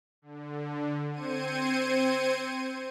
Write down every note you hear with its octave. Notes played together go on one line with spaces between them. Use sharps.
D3
C4 C5 G#6 C#7 D#7